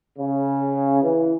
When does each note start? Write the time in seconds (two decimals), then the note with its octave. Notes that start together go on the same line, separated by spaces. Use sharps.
0.19 C#3
1.04 E3